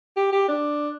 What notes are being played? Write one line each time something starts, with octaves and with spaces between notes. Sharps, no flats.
G4
G4
D4